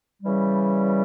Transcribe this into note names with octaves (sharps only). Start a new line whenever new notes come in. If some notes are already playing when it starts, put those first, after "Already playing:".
C#3 E3 G3